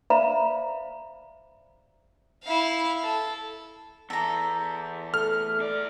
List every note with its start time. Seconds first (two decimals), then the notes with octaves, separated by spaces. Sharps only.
0.10 C5 D5 E5 F5 A#5 B5
2.44 E4 F5
3.03 A4
4.10 E2 A4 A#5
5.14 A3 F6
5.60 E2 D5